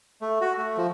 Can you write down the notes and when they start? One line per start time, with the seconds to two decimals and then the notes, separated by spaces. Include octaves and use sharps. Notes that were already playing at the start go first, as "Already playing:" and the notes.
0.21 A3
0.41 F#4
0.58 A3
0.77 F3